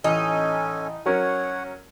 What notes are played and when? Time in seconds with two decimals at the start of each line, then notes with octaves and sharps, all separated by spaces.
0.04 A1 C#4 D#4 A4 G#5
1.06 F#3 C#4 A#4 C#5 F#5